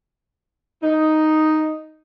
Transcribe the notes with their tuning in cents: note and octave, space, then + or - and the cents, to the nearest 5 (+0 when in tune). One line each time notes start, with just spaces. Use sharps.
D#4 +0